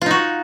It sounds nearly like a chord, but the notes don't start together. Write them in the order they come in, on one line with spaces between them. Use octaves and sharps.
F4 D#4 F#4